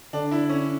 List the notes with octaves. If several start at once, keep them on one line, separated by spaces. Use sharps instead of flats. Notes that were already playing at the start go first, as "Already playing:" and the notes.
D3 D4
E4
C#4